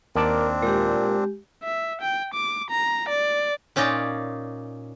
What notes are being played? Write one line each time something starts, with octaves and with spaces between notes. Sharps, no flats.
D#2 C4 D4 A#4 D5 A5
A#2 G#3 G4
E5
G5
D6
A#5
D5
A#2 C#4 D#4 F4 D5